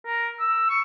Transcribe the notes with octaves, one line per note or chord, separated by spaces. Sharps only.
A#4
E6
C#6